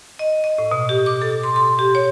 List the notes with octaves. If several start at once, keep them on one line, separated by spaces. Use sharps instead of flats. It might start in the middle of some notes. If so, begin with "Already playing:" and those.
D#5
D#5
A2
B2
G4
D6
A4
C6
C6
G4
C#5